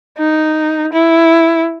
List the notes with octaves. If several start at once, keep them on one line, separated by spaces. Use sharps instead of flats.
D#4
E4